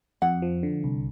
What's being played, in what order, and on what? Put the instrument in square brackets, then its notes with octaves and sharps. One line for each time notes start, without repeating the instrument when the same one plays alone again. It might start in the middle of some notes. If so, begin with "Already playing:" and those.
[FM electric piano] F2 [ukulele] F#5
[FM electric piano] F3
D3
C2